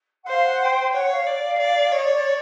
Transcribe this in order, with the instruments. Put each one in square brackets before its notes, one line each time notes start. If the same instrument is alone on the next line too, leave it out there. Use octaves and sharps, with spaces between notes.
[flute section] F#5
[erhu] C5 [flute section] F5
[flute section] F#5
G5
G5
[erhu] C#5 [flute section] F#5
[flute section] F5
[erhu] D5
D5
[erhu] C#5 [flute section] D#5
[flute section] D5
D5